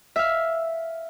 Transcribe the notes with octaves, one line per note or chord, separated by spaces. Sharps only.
E5 F5